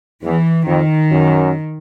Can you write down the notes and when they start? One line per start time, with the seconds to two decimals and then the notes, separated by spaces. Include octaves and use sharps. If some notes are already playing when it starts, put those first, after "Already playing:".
0.23 E2 E3
0.67 F2 D#3
1.11 F#2